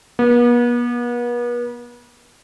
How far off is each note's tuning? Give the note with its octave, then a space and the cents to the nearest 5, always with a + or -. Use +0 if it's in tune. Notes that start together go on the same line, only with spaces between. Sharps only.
B3 -40